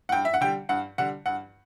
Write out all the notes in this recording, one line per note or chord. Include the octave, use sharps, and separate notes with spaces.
F#5
G2 G5
E5
F#5
D3 G3 G5
G2 F#5
D3 G3 F#5
G2 F#5